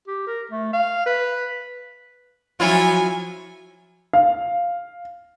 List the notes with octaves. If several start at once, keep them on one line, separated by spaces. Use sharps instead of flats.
G4
A#4
A3
F5
B4
F3 F#3 C#4 E4 F4 G#5
F5